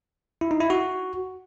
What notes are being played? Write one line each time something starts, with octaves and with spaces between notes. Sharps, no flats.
E4
D#4
E4
F#4